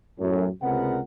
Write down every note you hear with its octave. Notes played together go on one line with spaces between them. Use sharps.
F#2 A2
C#2 C3 G#3 B3 A#4 F#5